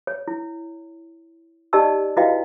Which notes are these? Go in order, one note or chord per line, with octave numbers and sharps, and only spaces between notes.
C#5
E4
D#4 G4 D5 D#5 A5 E6
E4 F#4 B4 D#5 F5 G5